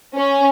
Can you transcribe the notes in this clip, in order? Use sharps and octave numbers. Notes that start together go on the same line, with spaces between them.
C#4